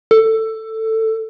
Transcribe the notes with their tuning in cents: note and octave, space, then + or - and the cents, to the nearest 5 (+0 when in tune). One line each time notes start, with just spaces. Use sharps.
A4 +15